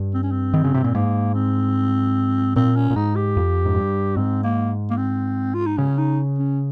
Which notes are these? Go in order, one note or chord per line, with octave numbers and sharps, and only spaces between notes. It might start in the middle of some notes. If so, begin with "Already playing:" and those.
Already playing: G2
C4
C#4
C4
D#3
C#3
C3
A#2
G#2 A#3
C4
A#2 C4
C#4
A#2
G#2 D#4
G4
F2
G#2
G2
G#2 C4
A#3
A#3
C4
F4
D#4
C#3 C#4
D#4
C#4